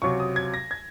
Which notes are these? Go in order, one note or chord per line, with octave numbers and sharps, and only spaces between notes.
C#2 C3 F#3 C#6
D#6
G#6
A#6
G#6